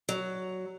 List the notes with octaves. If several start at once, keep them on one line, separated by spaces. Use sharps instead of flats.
F#3